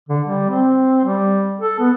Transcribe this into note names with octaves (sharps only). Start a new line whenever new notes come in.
D3
G3
C4
G3
A4
B3